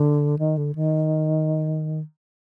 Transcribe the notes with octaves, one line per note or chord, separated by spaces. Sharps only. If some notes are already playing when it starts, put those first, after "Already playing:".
Already playing: D3
D#3
D3
D#3